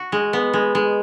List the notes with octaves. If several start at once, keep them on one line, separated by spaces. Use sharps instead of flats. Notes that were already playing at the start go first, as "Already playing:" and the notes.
Already playing: F#4
G#3
B3
G#3
G#3